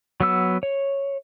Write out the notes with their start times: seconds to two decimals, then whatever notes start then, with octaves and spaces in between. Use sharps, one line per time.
0.20 F#3 B3 E6
0.63 C#5